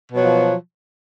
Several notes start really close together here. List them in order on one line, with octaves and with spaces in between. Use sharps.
B2 F#3 F3